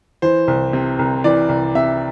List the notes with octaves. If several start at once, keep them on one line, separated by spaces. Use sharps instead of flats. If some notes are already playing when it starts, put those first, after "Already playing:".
E3 C5
C2
C3
C2
E3 D5
C2
C3 E5